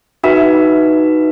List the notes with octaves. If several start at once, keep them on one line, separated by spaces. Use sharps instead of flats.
D#4 F#4 B4 E5